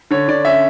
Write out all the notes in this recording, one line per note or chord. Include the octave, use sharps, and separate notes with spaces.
D3 C#5
D3 D5
C#4 E5